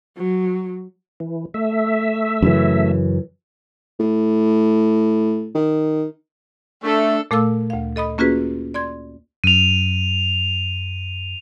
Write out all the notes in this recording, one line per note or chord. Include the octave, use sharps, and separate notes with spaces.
F#3
E3
A3 E5
F#2 C#3 E3
A2
D#3
A3 D4 A4
A#2 A3 A4 F5 D6 E6
D2 F5
A4 D#5 B5 D#6
A#3 C#4 F4 F#4 G#4 B4
D5 C6 G#6
F#2 D#7 F7